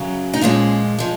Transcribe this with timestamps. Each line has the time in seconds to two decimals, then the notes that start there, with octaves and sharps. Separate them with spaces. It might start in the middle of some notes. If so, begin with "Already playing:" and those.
Already playing: F#2 C#3 F#3
0.33 D#4
0.41 A#2 F3 G#3 C#4
0.98 F3 G#3